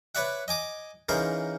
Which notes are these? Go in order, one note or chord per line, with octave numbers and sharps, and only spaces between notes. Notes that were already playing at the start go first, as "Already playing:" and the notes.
B4 C#5 D5 E5 F#5
D#5 G#5 D6 D#6
C#3 E3 D#4 G#4 A#4 C5